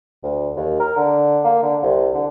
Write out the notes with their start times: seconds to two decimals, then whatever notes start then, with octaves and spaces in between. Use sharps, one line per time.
0.23 D2
0.56 D#2
0.80 A#4
0.97 D3
1.44 A#3
1.63 D3
1.83 C2
2.14 D3